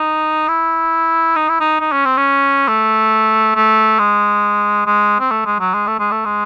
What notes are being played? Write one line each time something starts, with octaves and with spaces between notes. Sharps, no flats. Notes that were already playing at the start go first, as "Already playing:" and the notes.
Already playing: D#4
E4
D#4
E4
D#4
D#4
C#4
C4
C#4
A3
A3
G#3
G#3
C4
A3
G#3
F#3
G#3
A3
G#3
A3
G#3